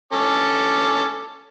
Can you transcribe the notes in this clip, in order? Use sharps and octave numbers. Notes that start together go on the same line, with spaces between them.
C#4 A4 D6